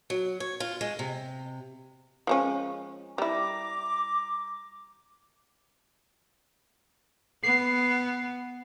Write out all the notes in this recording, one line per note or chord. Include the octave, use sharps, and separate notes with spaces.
F#3
C#5
F4
G#3
C3
F3 G#3 C#4
G3 E4 A#5 D6
B3 C7